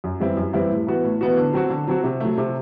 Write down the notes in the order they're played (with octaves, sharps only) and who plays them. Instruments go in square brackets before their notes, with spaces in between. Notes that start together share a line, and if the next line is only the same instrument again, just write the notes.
[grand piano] F#2
E3 G3 C4 E4
F#2
E3 G3 C4 E4
A2
E3 B3 F#4
A2
E3 B3 F#4
D3
F#3 C4 F#4
D3
F#3 C4 F#4
C3
F#3 A3
C3